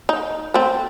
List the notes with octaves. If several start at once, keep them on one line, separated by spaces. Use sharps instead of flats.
D#4
A3 C4